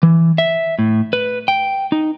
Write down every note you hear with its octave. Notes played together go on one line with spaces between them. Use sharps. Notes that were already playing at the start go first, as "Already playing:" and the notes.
E3
E5
A2
B4
G5
D#4